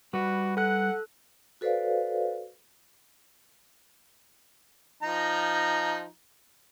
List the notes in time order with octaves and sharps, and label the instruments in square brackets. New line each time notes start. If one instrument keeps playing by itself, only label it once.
[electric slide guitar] G3 B4 [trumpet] F#4
[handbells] A4 F#6 [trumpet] F#5
[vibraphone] F#4 A4 B4 C5 D5 F5
[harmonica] F3 D#4 A#5